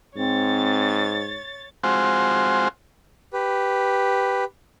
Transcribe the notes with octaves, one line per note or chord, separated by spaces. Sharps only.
G#2 C4 C#5 A6
G#3 C4 F4 F#4 C5
G4 B4